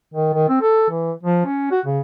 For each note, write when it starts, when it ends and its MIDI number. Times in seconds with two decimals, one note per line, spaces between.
0.14 0.32 51
0.34 0.48 51
0.49 0.59 60
0.61 0.87 69
0.90 1.12 52
1.23 1.41 53
1.45 1.68 61
1.71 1.80 66
1.86 2.00 49